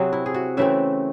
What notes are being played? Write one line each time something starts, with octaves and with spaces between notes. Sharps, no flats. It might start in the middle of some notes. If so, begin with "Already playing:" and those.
Already playing: C3 F#3 C4 F#4 G#4 C5
E4
G#4
F#4
C#3 E3 A3 C4 E5